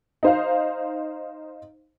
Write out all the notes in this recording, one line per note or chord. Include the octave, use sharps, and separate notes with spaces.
D#4 C5 F5